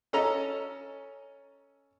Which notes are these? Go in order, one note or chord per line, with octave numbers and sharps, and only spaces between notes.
C#4 A4 D#5 A#5